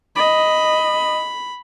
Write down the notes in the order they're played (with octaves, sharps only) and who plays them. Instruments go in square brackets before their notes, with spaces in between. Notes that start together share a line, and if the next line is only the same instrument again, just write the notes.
[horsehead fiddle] D#5 [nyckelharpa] B5